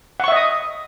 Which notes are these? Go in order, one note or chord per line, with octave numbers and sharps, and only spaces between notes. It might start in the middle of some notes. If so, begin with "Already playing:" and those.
D#5 E5 F#5 C#6 D#6